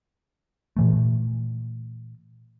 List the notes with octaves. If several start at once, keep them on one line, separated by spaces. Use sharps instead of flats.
A#2 E3 A3